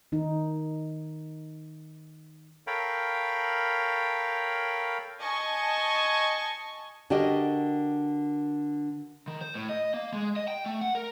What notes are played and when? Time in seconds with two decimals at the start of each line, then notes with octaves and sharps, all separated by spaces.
0.12 D#3 D#4
2.67 A4 A#4 C#5 F5 G5 B5
5.21 D#5 G#5 A5 C#6
7.10 D3 F#4 G4 A#4 D#5
9.28 D#3
9.41 C5
9.55 A2
9.69 D#5
9.94 A#3
10.13 G#3
10.36 D#5
10.48 G5
10.66 A3
10.81 F#5
10.95 A#4